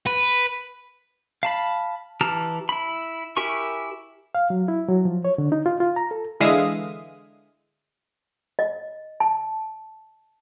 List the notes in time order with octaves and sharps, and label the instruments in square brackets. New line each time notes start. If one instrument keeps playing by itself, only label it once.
[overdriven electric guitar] B4
[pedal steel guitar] F5 A5 B5
E3 G4 A5 A#5 F6
E4 B5
E4 G4 A#4 G#5 C#6
[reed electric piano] F5
F#3
E4
F#3
F3
C#5
D3
D#4
F4
F4
A#5
A4
[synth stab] D3 E3 G#3 E5 F5 D#6
[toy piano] D#5
A5